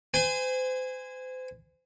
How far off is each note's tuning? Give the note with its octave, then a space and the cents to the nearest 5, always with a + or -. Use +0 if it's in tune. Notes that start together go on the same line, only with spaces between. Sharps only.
C5 -35 G#5 -15